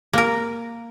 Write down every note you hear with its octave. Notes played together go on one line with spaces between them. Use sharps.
A#3 A#4